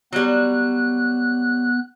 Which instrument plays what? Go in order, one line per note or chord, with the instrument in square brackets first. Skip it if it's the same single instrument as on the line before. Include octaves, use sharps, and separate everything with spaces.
[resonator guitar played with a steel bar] F#3 G3 [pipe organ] B3 F#6